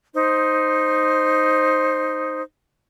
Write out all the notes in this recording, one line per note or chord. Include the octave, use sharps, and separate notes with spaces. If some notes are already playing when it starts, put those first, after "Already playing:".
D#4 C5